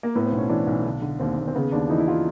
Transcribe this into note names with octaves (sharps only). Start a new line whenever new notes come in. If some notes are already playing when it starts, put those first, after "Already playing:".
A#3
A2 B3
C4
B1
C#4
E3 D4
B1
D3
D3
D#2 C4
D#2
C4
C#3 B3
D#2 D4
E3 D#4
E4
F4